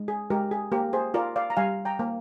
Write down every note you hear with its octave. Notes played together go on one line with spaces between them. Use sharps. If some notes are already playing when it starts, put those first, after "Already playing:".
Already playing: G#3
G#4
G#3 G4 A#4
G#4
A#3 G4 A#4
G#4 C5
F4 A#4 D5
D5 F5
A#5
G3 F5 G#5
G5 A#5
A#3